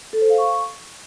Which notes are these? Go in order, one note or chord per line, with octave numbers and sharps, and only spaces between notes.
A4
C5
F5
C#6